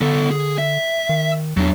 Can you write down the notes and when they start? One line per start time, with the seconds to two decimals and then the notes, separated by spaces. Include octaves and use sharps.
0.01 D3 B3 A4
0.31 G#4
0.58 E5
1.09 D#3
1.57 E2 F#3 D4